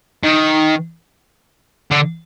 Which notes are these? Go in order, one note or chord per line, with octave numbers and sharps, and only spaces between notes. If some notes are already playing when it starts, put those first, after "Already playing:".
D#3
D3